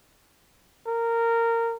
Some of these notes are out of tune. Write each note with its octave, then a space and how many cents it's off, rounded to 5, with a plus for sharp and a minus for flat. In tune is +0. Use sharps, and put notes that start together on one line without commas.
A#4 -15